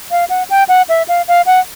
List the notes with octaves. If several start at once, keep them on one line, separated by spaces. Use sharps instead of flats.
F5
F#5
G5
F#5
E5
F5
F5
F#5